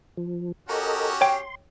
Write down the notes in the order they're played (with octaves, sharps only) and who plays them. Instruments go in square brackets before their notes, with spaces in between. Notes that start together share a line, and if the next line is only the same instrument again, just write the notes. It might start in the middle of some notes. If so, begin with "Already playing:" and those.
[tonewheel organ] F3
[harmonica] C#4 F#4 G4 [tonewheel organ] A4 A#4 D#5
[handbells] C#5 G5 [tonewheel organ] C6